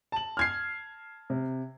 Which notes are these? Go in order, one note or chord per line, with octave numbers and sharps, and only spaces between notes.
A5 F#7
F6 G#6 C7
C3